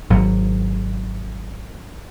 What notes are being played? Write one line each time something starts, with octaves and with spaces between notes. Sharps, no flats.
G#1 F#3